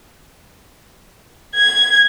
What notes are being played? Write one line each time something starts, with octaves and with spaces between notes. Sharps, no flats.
G#6